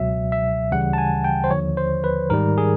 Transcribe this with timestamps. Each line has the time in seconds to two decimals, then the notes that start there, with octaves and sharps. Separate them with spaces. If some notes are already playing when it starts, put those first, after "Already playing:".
Already playing: C#2 B2 F#3 E5
0.32 E5
0.72 D2 C#3 E3 G3 F#5
0.93 A5
0.98 G#5
1.24 G5
1.44 C5
1.51 D#2 D3 F3 C#5
1.77 C5
2.04 B4
2.30 G#2 D#3 G3 A#4
2.58 G#4